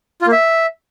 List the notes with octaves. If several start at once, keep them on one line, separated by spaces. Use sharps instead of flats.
F4
A#3
E5